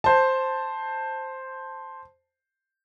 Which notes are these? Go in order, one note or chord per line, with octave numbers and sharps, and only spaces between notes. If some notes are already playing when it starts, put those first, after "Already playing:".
C5 A5